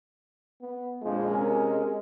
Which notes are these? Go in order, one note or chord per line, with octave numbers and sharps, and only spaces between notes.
B3
A#1 F2 F3 G#3
C3 C#4 A#4